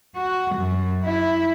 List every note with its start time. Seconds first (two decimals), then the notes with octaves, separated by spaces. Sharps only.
0.15 F#4
0.56 F#2
1.04 E4